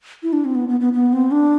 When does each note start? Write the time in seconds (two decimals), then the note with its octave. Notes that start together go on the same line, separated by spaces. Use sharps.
0.23 E4
0.33 D4
0.45 C4
0.55 B3
0.69 B3
0.80 B3
0.93 B3
1.13 C4
1.31 D4